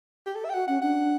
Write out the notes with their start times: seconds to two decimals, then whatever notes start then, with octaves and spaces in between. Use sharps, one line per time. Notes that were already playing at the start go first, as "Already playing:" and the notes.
0.26 G4
0.35 A4
0.44 E5
0.49 G5
0.53 F#4 F#5
0.67 C#4 F#5
0.82 D4 F#5